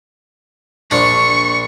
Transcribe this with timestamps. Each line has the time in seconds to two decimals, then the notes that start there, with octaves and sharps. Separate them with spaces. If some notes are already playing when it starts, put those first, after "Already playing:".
0.91 A#1 D4 C#6